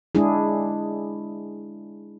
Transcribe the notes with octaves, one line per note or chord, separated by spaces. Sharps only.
G#3 D4 E4 G#4